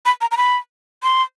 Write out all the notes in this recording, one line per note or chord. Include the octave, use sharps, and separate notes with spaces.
B5
A#5
A#5
B5
C6